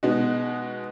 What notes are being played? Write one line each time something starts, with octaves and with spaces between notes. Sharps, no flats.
B2 G#3 B3 D#4 F#4